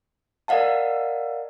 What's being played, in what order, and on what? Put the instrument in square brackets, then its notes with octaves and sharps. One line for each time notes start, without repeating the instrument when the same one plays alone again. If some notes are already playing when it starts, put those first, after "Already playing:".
[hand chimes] A#4 D5 D#5 F5 F#5 A5